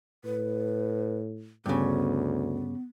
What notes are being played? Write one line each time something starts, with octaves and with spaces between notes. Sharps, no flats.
A2 B4
D2 G2 C#3 B3